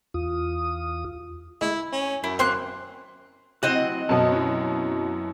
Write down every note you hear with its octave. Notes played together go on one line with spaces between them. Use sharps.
E2 F4 D#6
G#3 E4
C#4
F#2 E4
A#3 C4 C6 F#6
F#3 C4 E4 F#4 D#5 F#5
F#2 B2 A5
C#4 E4